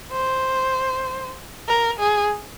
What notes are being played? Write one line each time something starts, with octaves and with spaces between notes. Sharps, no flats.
C5
A#4
G#4